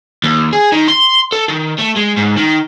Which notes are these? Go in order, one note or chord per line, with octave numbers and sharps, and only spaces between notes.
D#2
G#4
D#3
C6
A4
D#3
A3
G#3
G#2
D#3